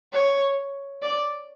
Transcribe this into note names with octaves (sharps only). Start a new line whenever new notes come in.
C#5
D5